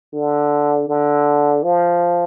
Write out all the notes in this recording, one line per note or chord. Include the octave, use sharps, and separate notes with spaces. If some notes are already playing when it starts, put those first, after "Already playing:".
D3
D3
F3